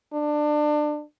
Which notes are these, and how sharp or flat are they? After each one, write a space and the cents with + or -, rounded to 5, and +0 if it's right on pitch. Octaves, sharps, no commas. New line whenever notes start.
D4 +25